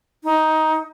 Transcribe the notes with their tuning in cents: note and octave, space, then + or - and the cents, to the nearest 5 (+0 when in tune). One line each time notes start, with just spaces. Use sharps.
D#4 +10